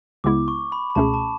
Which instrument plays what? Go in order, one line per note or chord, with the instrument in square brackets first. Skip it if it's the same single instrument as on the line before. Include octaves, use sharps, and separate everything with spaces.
[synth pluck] C#2 C#3 G#3 B3 E4 [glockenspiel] D6
[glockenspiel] C#6
B5
B5
[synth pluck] C#2 B2 A3 C#4 G#4 [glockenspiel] A5
[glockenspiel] A5